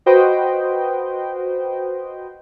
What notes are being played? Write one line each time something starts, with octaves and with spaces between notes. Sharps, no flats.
F#4 B4 C5 D#5 G5